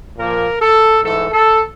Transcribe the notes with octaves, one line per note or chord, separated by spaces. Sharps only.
A#2 F3 A#3 A#4
A4
G#2 E3 A3 A4
A4